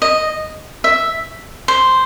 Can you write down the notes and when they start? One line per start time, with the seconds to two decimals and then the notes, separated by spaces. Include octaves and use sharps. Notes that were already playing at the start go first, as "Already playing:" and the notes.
0.02 D#5
0.84 E5
1.68 C5